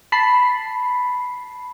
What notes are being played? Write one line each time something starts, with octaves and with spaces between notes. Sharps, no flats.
A5 B5 C7